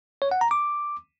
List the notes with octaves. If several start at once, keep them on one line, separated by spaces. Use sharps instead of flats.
C#5
F#5
A#5
D6